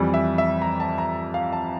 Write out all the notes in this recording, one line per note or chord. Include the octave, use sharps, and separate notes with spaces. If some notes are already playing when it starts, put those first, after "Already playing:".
Already playing: F2 E3 G3
E5
E5
A#5
A5
A#5
F5
A5